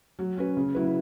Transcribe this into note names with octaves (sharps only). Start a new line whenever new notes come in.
F#3
C#4 F#4 B4
C#3
F#3 E4 B4